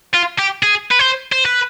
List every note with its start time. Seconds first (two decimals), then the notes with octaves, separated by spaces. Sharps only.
0.14 F4
0.39 G4
0.63 G#4
0.91 B4
0.99 C5
1.33 C5
1.46 B4